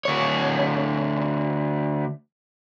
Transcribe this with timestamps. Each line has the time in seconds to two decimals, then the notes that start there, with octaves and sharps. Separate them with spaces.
0.05 D2 C#5